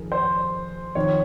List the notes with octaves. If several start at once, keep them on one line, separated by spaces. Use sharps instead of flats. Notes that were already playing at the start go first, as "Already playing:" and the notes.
Already playing: F2 D#3 G#4 A#4
C5
F2 D#3 C#5